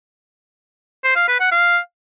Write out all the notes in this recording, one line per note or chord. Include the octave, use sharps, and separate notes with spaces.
C5
F5
B4
F#5
F5